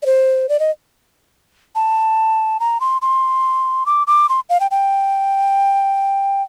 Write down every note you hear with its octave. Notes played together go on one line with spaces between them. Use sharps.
D5
C5
D5
D#5
A5
A#5
C6
C6
D6
D6
C6
F5
G5
G5